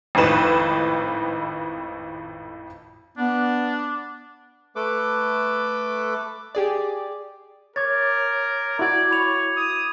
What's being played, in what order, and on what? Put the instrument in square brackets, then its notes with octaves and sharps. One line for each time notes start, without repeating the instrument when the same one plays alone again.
[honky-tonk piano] G#1 F2 A2 D#4 B4 E7
[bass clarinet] B3 [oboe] D4
[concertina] A3 A4 B4 D6
[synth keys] G4 G#4 D5
[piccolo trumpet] A#4 [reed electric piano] C#5 [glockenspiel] D6 G#6 A6
[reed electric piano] E4 F#4 [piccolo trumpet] D5 [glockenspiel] D6 G#6
[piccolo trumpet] C#5 [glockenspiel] B5 F7
[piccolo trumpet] D#6